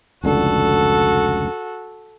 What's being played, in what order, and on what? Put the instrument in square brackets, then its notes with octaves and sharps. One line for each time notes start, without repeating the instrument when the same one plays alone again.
[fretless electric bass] F1 C#2 D3 [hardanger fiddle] F#4 A4